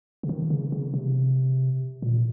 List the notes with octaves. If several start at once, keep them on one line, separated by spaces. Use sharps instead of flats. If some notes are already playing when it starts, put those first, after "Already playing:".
C#3
D#3
C#3
C#3
C3
A#2